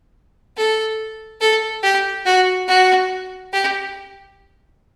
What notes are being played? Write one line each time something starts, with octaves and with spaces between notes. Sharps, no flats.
A4
A4
G4
F#4
F#4
G4